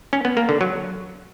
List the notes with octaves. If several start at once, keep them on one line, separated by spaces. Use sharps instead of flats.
C#4
B3
A#3
D3
F#3